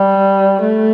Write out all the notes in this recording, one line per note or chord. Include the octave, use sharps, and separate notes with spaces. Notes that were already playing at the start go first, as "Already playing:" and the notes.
Already playing: G3
A3